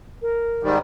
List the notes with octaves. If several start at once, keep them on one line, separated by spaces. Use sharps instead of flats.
A#4
G#2 D#3 G3